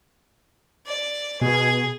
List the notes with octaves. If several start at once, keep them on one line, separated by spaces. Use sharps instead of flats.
D5
B2 G#4